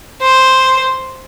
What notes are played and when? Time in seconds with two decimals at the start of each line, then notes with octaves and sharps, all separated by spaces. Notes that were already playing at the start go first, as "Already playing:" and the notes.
0.22 C5